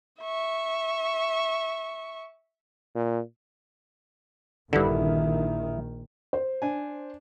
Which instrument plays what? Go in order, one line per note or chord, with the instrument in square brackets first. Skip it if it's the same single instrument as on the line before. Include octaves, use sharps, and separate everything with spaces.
[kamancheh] E5 C#6
[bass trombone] A#2
[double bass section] A#1 D#3 [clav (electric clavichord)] G2 D3 [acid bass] E4
[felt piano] C5
[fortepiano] D4 G#5